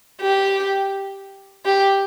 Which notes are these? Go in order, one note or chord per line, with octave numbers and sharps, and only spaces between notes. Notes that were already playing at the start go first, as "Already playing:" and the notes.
G4
G4